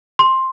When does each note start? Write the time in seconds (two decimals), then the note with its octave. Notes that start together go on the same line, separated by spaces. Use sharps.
0.19 C6